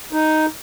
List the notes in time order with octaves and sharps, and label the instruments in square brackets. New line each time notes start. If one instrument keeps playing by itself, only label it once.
[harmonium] D#4